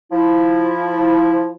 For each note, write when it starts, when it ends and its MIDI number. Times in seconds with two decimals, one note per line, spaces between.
0.12 1.51 53
0.12 1.51 64